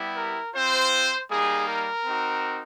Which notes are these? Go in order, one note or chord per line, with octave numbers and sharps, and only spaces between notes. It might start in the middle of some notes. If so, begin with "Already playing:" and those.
Already playing: G3 B3 E4 G4
A#4
C4 F4 C5
G3 A#3 D#4 G#4
A#4
C4 D#4 F#4